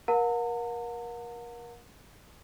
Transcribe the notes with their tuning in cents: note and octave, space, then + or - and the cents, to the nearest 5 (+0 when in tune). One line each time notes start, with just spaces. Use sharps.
A#4 +30 F#5 -45 A#5 -45